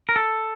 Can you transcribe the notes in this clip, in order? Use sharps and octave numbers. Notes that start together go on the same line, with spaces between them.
A#4
A4